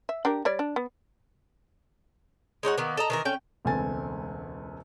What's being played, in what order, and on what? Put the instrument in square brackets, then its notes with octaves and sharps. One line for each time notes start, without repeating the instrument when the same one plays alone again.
[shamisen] E5
D4 G4 A#4
G3 C#5 D5
D4
B3
[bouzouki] G#3 D#4 C#5 F#5
D#3 A#3 B3
A4 D#5 A#5
D#3 E3 A#4
A3 C#4 G5
[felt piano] E1 C#2 A3 C4 G#5 A6